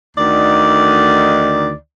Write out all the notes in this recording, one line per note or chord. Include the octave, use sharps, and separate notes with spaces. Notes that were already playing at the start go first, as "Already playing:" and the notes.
D2 D3 D#3 D#4 D5